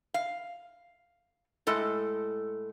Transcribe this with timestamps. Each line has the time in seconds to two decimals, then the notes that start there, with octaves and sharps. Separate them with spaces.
0.14 F5
1.67 A2 G#3 A4